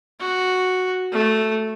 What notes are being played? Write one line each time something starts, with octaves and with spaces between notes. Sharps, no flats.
F#4
A3